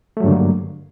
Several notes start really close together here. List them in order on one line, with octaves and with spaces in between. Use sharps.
A3 F#3 G2 D3 A#3